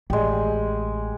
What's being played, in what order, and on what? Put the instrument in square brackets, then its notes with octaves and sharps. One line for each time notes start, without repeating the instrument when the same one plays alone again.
[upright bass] A1 [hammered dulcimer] G#3 G4